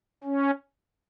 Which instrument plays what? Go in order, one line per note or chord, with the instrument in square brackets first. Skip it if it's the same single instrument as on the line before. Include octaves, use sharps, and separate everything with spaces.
[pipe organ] C#4